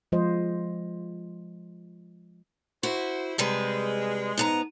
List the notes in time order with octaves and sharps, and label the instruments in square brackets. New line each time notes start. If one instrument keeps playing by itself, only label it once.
[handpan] F3 G#3 F4 C5 D#5
[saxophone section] E4 C5 [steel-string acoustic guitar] F#4
[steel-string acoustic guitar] C3 G3 B4 [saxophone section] G#3
[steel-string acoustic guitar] G#2 B3 A#5